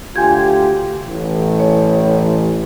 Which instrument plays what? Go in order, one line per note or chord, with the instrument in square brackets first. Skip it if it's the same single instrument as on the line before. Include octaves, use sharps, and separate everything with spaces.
[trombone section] D2 F4 G4 [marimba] G#5 G6 G#6
[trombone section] A1
[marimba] C#5